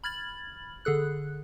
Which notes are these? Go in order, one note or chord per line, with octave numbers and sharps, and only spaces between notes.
B5 F6 G#6 A6 F#7
D3 G#4 A4 F#6